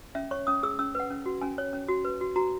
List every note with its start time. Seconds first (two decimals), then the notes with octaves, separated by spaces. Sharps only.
0.15 C#4 E5
0.31 C#5 C#6
0.47 C#4 D#6
0.63 G#4 E6
0.79 C#4 E6
0.95 B4 F#5
1.10 C#4
1.26 F#4
1.41 C#4 G#5
1.58 C#5
1.73 C#4
1.88 F#4
2.05 B4
2.21 F#4
2.36 F#4 A#5